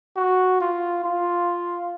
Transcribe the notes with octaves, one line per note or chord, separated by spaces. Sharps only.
F#4
F4
F4